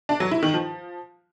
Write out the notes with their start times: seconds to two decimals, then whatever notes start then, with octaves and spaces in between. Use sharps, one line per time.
0.09 D4
0.20 F#3
0.31 E4
0.43 D#3
0.54 F3